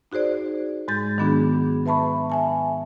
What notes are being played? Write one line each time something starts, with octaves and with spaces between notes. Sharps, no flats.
D#4 F#4 G#4 C5 D5
G#2 G#3 G6 A6
D#3 F#3 B3 D4 F#4 G#4
B4 E5 A5 B5 C#6
E5 G#5 A5